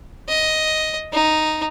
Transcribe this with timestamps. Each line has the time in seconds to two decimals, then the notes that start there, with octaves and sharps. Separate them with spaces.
0.28 D#5
1.13 D#4